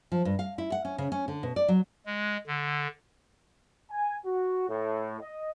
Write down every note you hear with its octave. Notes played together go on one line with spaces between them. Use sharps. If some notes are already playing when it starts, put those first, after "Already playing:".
F3
G2
F5
E4
F#5
C#4
C#3
C#4
D3
B2
D5
F#3
G#3
D3
G#5
F#4
A2
D#5